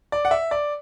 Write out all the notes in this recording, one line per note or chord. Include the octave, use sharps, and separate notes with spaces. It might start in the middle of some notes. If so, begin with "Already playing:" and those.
D5
F#5
E5
D5